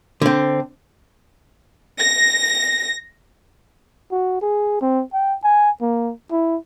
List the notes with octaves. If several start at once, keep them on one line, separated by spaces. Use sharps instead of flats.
D3 C4
A#6
F#4
G#4
C4
G5
G#5
A#3
E4